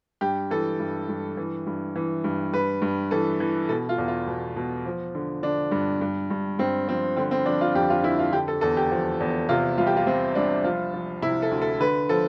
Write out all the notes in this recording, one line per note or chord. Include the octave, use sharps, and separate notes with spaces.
G2 G4
E3 A4
G2
G2
E3
G2
E3
G2
G2 B4
G2
E3 A4
E3
B2 A4
F4
E2
F4
B2
B2
F3
D3
D3 D4
G2
G2
G2
G2 C4
F3 C4
D3 C4
C4
F3 D4
F4
F2 G4
F4
D3 E4
F4
D3 G4
A4
E2 A4
G4
F3
E2
C3 F4
C2 F4
G4
F4
C2 C4
C2 D4
F3 F4
F3
C3 E4
A4
D2
A4
D3 B4
F3 A4